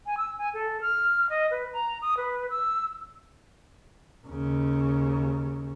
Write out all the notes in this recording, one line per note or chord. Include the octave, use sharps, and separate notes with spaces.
G#5
E6
G#5
A4
F6
D#5
B4
A#5
D#6
B4
E6
D#2 C#3